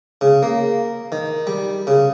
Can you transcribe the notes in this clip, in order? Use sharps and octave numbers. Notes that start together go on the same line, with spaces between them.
C#3
A#3
D#3
G3
C#3